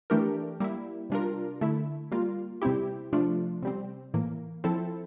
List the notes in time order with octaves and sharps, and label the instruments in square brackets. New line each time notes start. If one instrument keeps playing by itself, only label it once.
[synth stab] E3 A3 D4 G4 A#4
G3 A#3 E4
C3 G3 D4 F4 A#4
D3 A3 E4
G3 A#3 F4
C3 G3 C4 E4 G4
C3 F3 A3 D4 F4
C3 G3 C4
A2 E3 A#3
F3 C4 E4 A4